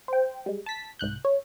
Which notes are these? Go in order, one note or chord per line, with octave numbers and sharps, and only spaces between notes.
C5 G5
G3 G#3
A5 B6
C2 G#2 F#6 G6
C#5